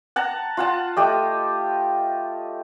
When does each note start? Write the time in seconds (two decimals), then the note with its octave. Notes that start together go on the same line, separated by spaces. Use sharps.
0.16 F#5 A5 A#5
0.57 F4 F#5 A5
0.97 A3 G4 D#5